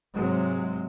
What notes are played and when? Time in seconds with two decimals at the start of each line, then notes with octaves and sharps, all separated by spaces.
0.15 G#2 C3 F#3 G#3